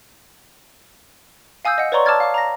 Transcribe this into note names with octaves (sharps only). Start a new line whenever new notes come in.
F5 G#5 D#6 E6 G6
D#5 F#5
B4 C#5 D5 A#5 C6 C#6
A5 D6 E6 F6 G#6 A6
F5 D6
A#5 A#6